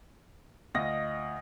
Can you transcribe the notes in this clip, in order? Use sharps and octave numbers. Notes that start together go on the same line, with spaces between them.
D2 F4 D#5 A#6